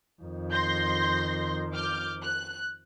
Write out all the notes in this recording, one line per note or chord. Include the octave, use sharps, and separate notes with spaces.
F2 D#3
C6 G6 A#6
D6 F6 G6
F#6